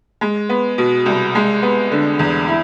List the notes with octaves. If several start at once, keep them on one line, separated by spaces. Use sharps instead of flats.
G#3
B3
B2
C2
G#3
B3
D3
E2
E4